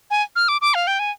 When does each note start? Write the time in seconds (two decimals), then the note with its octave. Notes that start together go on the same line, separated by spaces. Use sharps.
0.11 G#5
0.36 F6
0.48 D6
0.61 D6
0.74 F5
0.87 G5
0.99 G#5